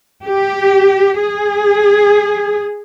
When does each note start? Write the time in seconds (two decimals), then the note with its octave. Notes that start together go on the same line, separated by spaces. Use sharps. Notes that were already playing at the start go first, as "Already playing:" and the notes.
0.24 G4
1.19 G#4